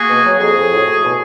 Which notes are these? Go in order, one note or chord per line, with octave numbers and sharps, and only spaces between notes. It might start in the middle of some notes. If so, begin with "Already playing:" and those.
Already playing: A#3 F#4 G#4
B2
F#3
F2 F#4 G#4
F2
A2
A2
B2